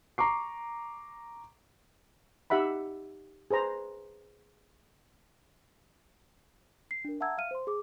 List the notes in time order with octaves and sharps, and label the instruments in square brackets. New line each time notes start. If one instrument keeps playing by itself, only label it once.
[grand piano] A#5 C#6 D6 C7
[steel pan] D#4 G4 E5 F#5 B5
G#4 B4 C5 A#5
[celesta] C7
D4 A#4
E5 F#5 A5 A#5 E6 G#6
E5 F5 F6 D#7
C5 C6
G#4 D6